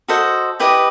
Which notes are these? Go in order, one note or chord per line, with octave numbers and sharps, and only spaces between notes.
F#4 A4 C5 D#5
E4 G4 B4 D#5